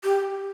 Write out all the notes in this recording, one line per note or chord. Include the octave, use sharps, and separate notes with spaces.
G4